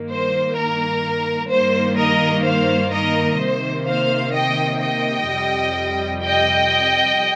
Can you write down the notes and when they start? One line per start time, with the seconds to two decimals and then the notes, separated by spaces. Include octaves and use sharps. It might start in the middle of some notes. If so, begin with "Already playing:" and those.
Already playing: G2 D#3 A#3
0.10 C5
0.56 A#4
1.51 G2 D#3 G3 A#3 C5
1.98 A#4 D#5
2.45 C5 F5
2.93 A#4 D#5
3.40 C3 D#3 A#3 C5
3.87 C5 F5
4.34 D#5 G5
4.82 D#5 G5
5.30 F2 C3 G3
6.23 D#5 G5